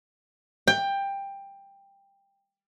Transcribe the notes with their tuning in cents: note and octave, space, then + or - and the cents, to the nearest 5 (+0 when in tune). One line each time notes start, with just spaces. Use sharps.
G5 +15